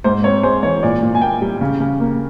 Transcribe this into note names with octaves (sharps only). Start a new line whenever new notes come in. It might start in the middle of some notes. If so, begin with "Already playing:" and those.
G#2 C5
C4 C#5
G#3 C5
E3 C#5
A#2 D5
A#2
G#5
A#3 G5
G3
C#3
C#3
A#3